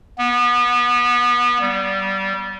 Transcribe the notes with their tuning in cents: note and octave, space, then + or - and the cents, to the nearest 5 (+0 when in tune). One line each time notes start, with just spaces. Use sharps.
B3 -25
G3 -20